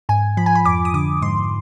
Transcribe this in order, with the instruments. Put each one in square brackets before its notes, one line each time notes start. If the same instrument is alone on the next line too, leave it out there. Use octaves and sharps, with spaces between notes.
[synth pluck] G#2 G#5
F3 B5
G#5
B5
F2 D6
D#6
D3 D6
G#2 C6